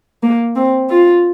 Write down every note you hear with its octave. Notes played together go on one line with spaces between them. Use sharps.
A#3
C4
F4